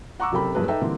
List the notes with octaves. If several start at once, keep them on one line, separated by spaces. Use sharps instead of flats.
F#5 A#5 C#6 D6 E6
F#1 C3 A4 A#4 G5 B5
F#1 G2 A#2 G#4 A#4 B4
D#4 A4 B4 E5 G5 A#5
D3 E3 G3 A#3 C4